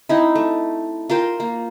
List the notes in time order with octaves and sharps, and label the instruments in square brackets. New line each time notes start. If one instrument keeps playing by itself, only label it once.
[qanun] C4 D#4 E4
A3
F4 A#4 C5 G5
A#3